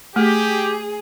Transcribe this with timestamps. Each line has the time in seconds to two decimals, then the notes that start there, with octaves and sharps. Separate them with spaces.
0.16 A3 G4 G#4